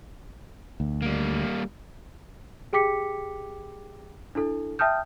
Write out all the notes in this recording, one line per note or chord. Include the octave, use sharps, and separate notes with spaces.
D2
G3 A#3
G4 G#4 G5 D6 B6 C#7
D4 E4 A4
E5 G5 A5 D#6 F6 G6